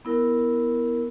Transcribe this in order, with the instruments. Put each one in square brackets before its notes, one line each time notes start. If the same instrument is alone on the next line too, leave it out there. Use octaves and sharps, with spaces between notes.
[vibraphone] B3 E4 A#4